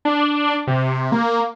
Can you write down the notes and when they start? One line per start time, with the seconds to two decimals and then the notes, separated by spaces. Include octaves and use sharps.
0.05 D4
0.67 C3
0.79 C3
1.12 A#3